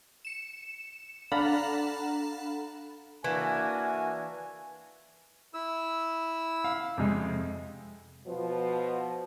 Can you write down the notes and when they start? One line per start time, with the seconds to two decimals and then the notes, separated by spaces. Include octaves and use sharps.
0.25 C#7 E7
1.32 D4 A4 F5 F#5 A#5 B5
3.24 E3 A#3 D4 F#4 G#5
5.54 E4 E6
6.64 F5
6.97 F2 C3 G#3
8.27 B2 F3